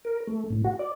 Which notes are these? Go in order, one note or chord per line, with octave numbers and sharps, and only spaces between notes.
A#4
A3
A2
F#4
D5